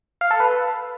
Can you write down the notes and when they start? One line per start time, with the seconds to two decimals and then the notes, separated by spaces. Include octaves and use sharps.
0.21 F5
0.31 A4
0.40 B4